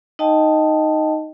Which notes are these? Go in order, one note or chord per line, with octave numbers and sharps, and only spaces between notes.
D#4 D#5 G5 A5